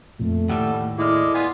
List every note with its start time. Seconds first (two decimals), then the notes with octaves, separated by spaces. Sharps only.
0.20 F2 A#2 A3
0.49 D#2 A2 G3 A4 F#5
0.98 G#3 E4 A4 D5 D6 F6
1.34 B3 F4 G#5